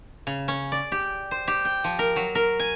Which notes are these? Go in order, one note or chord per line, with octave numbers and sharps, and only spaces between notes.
C#3
C#4
D5
G4
C5
G4
G5
F3
A#4
F#3
A#4
G#5